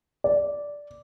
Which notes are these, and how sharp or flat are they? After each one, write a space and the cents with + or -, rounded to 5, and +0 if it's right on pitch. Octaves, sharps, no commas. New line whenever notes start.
D5 -10